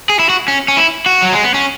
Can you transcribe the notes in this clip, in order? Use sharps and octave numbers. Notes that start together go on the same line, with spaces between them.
G#4
E4
F#4
C#4
C#4
E4
F#4
F#3
G#3
B3
C#4